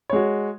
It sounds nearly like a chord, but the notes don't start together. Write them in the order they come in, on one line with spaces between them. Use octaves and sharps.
C#5 G#3 F#4